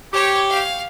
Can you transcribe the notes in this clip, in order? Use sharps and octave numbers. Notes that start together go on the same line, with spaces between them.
G4 C#5
F5